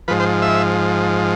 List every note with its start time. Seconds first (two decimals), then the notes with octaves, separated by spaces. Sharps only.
0.08 G#2 F3 B4
0.20 C5
0.42 E5